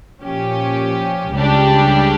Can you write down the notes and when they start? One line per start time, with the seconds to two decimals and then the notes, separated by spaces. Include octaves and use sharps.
0.21 A#2 F3 C#4 G4
1.33 C#2 C#3 G3 D4 G4